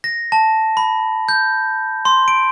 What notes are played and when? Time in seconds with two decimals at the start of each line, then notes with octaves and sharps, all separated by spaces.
0.04 A#6
0.32 A5
0.77 B5
1.29 G6
2.05 C6
2.28 D7